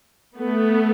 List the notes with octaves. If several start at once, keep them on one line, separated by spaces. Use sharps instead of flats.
A3 B3